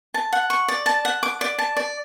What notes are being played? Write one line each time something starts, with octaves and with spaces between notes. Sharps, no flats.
A5
F#5
C#6
D5
A5
F#5
D6
D5
A5
D5